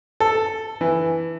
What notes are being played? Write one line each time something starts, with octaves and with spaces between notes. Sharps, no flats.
A4
E3